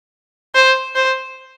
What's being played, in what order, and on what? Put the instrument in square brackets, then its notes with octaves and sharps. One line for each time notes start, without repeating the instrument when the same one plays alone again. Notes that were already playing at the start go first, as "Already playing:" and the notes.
[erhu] C5
C5